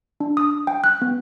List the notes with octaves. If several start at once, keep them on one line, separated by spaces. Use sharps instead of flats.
D4
D#6
G5
F#6
B3